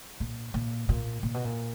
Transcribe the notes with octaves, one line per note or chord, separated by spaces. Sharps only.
A#2
A#2
A#2
A#2
B2
A#2